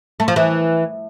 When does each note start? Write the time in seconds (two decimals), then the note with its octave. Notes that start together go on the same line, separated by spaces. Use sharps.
0.20 A3
0.28 F3
0.36 E3